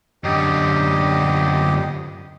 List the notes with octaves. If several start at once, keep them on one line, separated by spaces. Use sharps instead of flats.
F#2 D3 G4 D#5